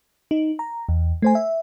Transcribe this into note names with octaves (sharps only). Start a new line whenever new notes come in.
D#4
A#5
E2
A3 C5 G#5
E5